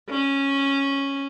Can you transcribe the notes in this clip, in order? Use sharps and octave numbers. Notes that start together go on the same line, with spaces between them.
C#4